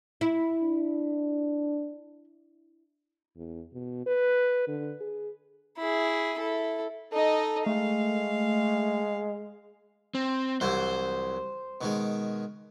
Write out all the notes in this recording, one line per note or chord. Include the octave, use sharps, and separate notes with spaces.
E4
D4
E2
B2
B4
D3
G#4
E4 G#4
E4 A4
D#4 A4 D#5
G#3 A3 F5
C4
C2 E3 F#3 C5
B2 D#3 G#3